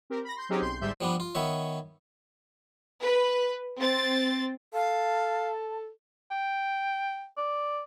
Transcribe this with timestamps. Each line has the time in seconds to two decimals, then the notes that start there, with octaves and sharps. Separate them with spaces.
0.10 C4 G4 A#4
0.24 B5 A#6
0.36 C6 G6
0.49 F#3 C4 C#4 D#4 G4 G#4
0.61 B1 C6 G6
0.81 G1 G#2 G3 E5 C6 G6
1.01 F3 G3 B3 D4
1.20 F4
1.35 D#3 B3 C#5 E5
3.03 B4
3.79 C4 A6
4.74 A4 F5 A5
6.31 G5
7.37 D5